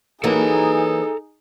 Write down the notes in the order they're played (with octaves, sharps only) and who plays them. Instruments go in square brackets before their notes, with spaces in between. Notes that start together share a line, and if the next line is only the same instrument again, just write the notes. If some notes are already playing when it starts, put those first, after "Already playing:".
[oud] E3 F#3 A#3 [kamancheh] D#4 G#4 [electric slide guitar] A4 A#5